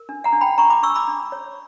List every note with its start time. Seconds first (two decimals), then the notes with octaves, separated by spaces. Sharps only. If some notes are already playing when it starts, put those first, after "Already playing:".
Already playing: A#4
0.09 D4
0.24 F#5 A#5
0.33 D4
0.41 G5 B5
0.58 D4 A#5 C#6
0.70 B5 D6
0.83 D4 C#6 E6
0.95 B5 D6
1.08 D4
1.32 C#5